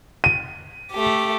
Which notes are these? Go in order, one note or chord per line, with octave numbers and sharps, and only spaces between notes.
D#7
A3 G4